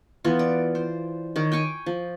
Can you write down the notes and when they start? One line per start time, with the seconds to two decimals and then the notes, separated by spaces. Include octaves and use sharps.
0.24 E3 B3 F4
0.39 D5
0.75 C5
1.36 D#3 C#5 D6
1.52 G5 G#5 C#6 D6
1.86 F3